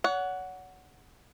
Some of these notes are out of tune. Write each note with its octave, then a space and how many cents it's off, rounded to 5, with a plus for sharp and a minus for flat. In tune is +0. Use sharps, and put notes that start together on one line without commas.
C#5 +35 F#5 +0